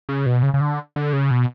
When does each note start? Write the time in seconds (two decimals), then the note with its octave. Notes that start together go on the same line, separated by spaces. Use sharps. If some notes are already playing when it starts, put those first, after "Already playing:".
0.09 C#3
0.26 B2
0.43 C#3
0.54 C#3
0.61 D3
0.96 D3
1.13 C#3
1.31 B2